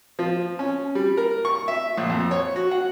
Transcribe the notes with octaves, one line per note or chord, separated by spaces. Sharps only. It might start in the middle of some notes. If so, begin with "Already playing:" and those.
F3
C#4
G3
A#4
C#6
E5
A#1
F2
C#5
F#4
F#5